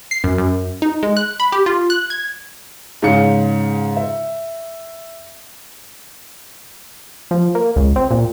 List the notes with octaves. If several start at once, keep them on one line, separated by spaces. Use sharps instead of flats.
C7
F#2
F#2
D#4
G#3
F#6
B5
G4
F4
F#6
G#6
G#2 C#3 F5 C#7
E5
F3
A#3
C#2
C4
A#2